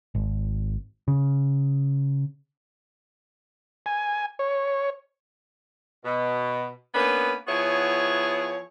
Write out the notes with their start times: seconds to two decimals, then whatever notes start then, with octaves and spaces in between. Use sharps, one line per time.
0.15 G#1
1.08 C#3
3.86 G#5
4.39 C#5
6.05 B2
6.94 A#3 B3 C#4 D4 B4
7.47 F3 B3 E4 F#4 G#4 C#5